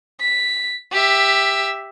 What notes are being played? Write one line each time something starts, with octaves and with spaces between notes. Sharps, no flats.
B6
G4 E5